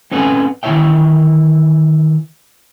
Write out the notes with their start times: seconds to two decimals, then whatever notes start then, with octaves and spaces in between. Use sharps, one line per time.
0.11 C4 C#4 A4 B4 F#5 G#5
0.63 D#3 E3 E4 C#5 E5 G5